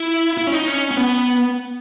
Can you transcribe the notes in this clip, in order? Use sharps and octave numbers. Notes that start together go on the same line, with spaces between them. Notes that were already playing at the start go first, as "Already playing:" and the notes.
Already playing: E4
E4
C#4
D#4
C#4
C#4
B3